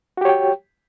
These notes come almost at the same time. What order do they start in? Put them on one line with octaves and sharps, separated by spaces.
F#4 G4 C#5 G5